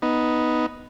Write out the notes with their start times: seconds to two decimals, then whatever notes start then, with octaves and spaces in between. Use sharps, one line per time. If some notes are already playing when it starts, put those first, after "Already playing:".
0.02 B3 D#4